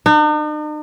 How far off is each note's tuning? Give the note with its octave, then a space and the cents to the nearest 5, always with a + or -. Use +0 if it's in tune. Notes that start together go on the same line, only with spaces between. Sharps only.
D#4 -45